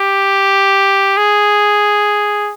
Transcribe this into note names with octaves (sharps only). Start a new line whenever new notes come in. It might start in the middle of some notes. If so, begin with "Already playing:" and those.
Already playing: G4
G#4